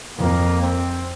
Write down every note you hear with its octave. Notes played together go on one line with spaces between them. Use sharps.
F2 A#3
C4